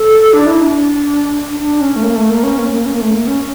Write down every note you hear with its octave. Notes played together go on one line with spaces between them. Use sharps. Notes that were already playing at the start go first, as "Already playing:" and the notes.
Already playing: A4
D4
E4
D4
D4
C#4
A3
A#3
A3
A#3
C#4
A#3
A#3
C#4
A#3
A3
A#3
C#4